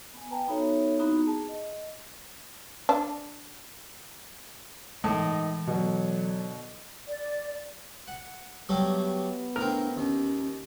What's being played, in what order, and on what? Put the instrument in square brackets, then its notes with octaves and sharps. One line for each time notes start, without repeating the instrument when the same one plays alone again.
[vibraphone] B3 G#5
B4 G5 A5 A#5
B3 D#4 F#4 A4 C#5 E5
B3 C4 D#4 E4 F#4 A#5
G#4 A5
D#5
[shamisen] D4
[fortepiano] A2 [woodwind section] D#3 D#5 [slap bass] E3 G#3
[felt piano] B2 [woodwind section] D3 F#3
[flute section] D5
[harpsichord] F#5
[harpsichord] F#3 G3 A3 [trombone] B3
[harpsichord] A2 C4 [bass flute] D4 [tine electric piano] A#4
[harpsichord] D#2 [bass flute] C#4